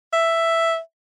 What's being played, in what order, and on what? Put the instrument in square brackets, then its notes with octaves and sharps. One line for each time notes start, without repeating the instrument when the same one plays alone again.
[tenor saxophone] E5